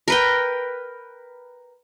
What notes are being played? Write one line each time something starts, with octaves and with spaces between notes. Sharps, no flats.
A#4 B4 G5